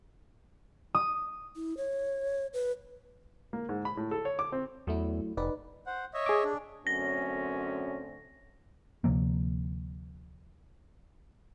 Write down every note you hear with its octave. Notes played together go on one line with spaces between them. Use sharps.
D#6
E4
C#5
B4
A#3
G#2
B5
A2
A4
C#5
D6
C4
E2 F#3 A3 E4
F1 D#4 B4 D5
C5 F#5
C#5 D#5 E5
G#4 D6
D4
F#2 D3 A3 C4 C#4 A#6
D2 C3 F3 A#3